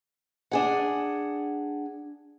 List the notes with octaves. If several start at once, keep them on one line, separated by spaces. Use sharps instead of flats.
D4 G#4 F#5